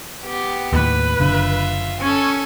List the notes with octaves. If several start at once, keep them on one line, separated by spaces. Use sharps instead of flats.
B3 G4
D#2 A2 B4
F#1 D3 F4 E5
C#4 A4 G#5